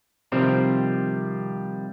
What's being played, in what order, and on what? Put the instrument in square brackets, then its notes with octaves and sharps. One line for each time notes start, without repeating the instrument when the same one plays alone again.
[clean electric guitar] C3 D#3 F3 G3 C4